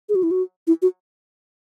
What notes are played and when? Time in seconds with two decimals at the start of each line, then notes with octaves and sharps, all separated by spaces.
0.09 G#4
0.15 F#4
0.23 E4
0.31 F#4
0.67 E4
0.82 F#4